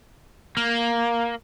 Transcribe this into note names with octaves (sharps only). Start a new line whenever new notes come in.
A#3